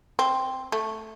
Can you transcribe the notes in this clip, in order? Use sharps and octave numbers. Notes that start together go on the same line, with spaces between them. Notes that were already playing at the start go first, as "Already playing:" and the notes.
C4
A3